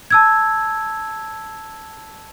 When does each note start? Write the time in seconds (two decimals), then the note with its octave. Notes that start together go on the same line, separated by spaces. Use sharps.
0.10 A5 E6 G#6